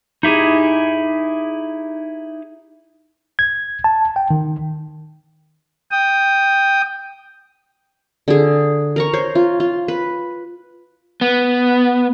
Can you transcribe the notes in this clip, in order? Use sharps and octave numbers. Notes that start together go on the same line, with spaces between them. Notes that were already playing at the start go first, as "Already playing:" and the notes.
D#4 E4 G4 G#4
G#6
A5
G5
D#3
G5 D#6
D3 G#4
A#4 A#5 C#6
C5 C#5
F4
F4
B4
B3